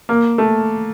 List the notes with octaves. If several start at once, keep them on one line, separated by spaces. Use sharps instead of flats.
A#3
A3